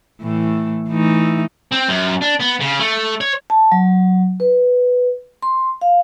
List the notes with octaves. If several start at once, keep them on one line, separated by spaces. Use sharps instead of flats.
A2 E3 A3
E3 A3 D#4
C4
F#2
D4
B3
C#3
A3
C#5
A5
F#3
B4
C6
F5